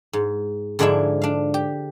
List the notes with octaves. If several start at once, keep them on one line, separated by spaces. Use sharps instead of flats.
G#2
G#2 D3 F3 G#3 D4 E4
D4 F5
G4